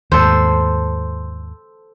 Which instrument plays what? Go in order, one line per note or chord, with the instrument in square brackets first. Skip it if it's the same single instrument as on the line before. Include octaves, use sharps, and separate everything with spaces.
[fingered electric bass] D#2 G#2 [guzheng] A4 C5